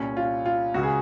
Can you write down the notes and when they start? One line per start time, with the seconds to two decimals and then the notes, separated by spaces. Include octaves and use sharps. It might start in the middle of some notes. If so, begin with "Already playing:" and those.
Already playing: C2 A#2 C#4
0.17 F4
0.46 F4
0.74 C#2 C#3 F#4
0.83 G#4